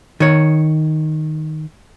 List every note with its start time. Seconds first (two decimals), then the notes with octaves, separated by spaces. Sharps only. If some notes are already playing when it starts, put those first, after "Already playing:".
0.20 D#3 C#5